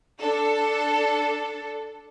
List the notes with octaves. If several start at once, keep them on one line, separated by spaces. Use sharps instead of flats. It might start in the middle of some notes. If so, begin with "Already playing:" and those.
D4 A4